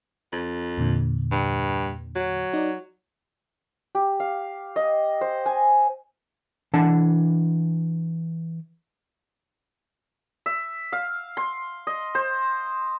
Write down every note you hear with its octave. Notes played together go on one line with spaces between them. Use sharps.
F2
E2 A#2 D3
G2
F#3
D#4 D5
G4
F5
D#5
C5
G#5
E3 D4 F#5 A5
E5
F5
C6
D#5
C5